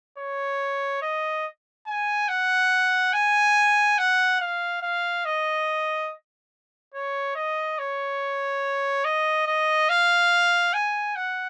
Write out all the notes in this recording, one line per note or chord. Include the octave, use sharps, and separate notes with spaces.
C#5
D#5
G#5
F#5
G#5
F#5
F5
F5
D#5
C#5
D#5
C#5
D#5
D#5
F5
G#5
F#5